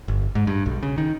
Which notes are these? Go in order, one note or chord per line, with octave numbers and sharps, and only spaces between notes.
G1
G#2
G2
B1
C#3
D#3